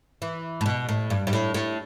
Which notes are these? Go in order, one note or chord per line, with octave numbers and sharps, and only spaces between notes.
E3
A2
B2
A2
G2
G2
A2
A2